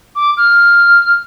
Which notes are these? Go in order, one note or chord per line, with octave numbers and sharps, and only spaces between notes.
D6
F6